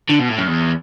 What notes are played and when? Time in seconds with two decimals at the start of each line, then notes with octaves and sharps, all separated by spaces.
0.09 D3
0.19 B2
0.29 A2
0.38 F#2
0.47 E2